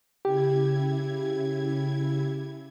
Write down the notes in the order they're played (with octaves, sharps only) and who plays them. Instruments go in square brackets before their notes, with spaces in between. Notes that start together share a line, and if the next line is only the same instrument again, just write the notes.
[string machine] C#3 E4 G#6 [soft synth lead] G4